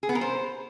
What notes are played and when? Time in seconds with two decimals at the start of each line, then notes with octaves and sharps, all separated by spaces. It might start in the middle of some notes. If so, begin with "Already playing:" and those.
0.03 G#4
0.09 B3
0.15 A#4
0.21 C5